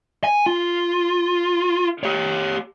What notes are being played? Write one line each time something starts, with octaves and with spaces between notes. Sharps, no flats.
G#5
F4
G4 C#5